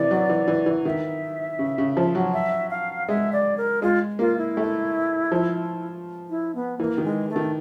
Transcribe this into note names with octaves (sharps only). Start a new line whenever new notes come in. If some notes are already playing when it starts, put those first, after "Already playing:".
Already playing: C3 E3 D5
F#3
E3
E3
E3
D#3 E5
C#3
C#3
F3
F#3
E5
F5
G#3 E5
D5
A#4
G#3 F4
A#3 F4
E4
A3
F3
E4
B3
E3 A#3
D#3
G#3
A3
D#3